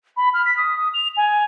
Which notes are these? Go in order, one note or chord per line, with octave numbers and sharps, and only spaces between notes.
B5
F6
B6
D#6
D#6
F7
G#5